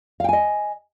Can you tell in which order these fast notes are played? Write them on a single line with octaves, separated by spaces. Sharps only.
F5 G5 G#5 D#5